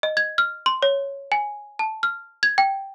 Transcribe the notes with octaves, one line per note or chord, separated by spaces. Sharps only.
D#5
G#6
F6
C6
C#5
G#5
A5
F6
G#6
G5